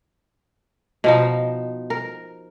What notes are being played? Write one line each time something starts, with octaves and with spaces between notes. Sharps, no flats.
B2 F3 D#4
A#4